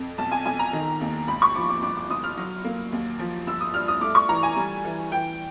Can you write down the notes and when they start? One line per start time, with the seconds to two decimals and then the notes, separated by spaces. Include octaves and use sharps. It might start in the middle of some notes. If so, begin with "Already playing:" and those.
Already playing: F2
0.18 B1 A5
0.32 G#5
0.45 B1 G#5
0.59 A#5
0.73 D#3
1.01 D#2
1.28 G#1 B5
1.42 C#6
1.55 F3 D6
1.69 D6
1.82 G1 D6
1.97 D6
2.10 G1 D#6
2.24 F6
2.37 F#3
2.65 A#3
2.92 D#2
3.19 F3
3.47 G1 E6
3.61 D#6
3.74 G2 F6
3.88 D#6
4.01 A3 D6
4.15 C#6
4.29 E3 A#5
4.43 G#5
4.56 G3
4.85 E3
5.12 E3 G5